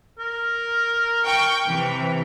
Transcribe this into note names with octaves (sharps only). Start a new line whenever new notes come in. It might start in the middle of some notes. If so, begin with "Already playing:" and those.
A#4
G5 C#6
C3 E3